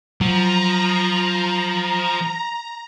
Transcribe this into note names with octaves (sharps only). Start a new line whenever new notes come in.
F3 F#3 A#5